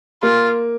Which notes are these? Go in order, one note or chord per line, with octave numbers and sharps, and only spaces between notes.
A#3 F4